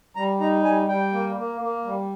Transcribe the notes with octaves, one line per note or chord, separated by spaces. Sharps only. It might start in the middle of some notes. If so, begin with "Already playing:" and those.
G3 A#5
D#4 A#5
G3 G#5
G3 G5
A#3
A#3
A#3
G3